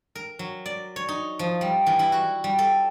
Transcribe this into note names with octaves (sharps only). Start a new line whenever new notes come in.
A#4
F#3
D5
C#5
D#4
F3
G3
E3
E4
F#4
G3
A4